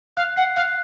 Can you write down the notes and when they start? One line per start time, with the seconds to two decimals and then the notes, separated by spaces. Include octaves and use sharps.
0.17 F5 F#6
0.36 F#5 C7
0.56 F5 F#6